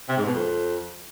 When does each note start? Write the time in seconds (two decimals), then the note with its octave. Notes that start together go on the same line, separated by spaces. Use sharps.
0.09 C3
0.17 G#2
0.26 B2
0.34 F2